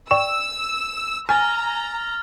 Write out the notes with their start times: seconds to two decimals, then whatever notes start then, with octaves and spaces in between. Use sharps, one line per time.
0.11 D5 G5 C#6 E6 E7
1.29 G#5 A#5 F6 A6